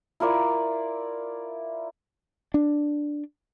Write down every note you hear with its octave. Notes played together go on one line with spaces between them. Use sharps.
E4 F4 A#4 D5
D4